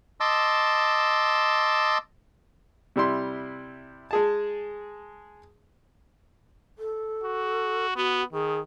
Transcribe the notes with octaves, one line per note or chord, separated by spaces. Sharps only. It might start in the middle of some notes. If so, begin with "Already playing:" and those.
D#5 A5 C6 D6 E6
C3 G3 E4 C6
G#3 G#4 A5
A4
F#4
B3 F#4
D#3 G#4